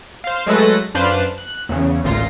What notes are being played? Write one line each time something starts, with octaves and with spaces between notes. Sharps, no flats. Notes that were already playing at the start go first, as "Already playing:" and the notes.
C5 F5
F#3 G#3 A3 A4 B4 A#6
F#2 D4 B4 C5 F5
F#6
E2 C#3
A1 D2 A#2 F4 A#6 C7